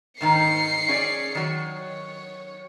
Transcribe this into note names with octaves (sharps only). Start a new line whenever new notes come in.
G#2 D#3 D#4 C7 C#7
C#4 G#4 D5
D#3 F#3
C#5